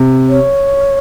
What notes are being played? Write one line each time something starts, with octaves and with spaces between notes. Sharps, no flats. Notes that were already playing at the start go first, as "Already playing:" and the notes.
Already playing: C3
C#5